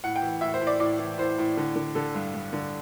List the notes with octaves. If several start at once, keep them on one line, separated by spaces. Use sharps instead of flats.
A2 F#5
G5
E3
A2 E5
C5
A2
D5
A2 D5
E3
A2 C5
A2
D3
D3
D3 A4
G2
G2
D3